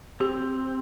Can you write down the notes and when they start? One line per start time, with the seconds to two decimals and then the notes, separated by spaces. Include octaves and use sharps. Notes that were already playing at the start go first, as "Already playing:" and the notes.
0.20 C4 G4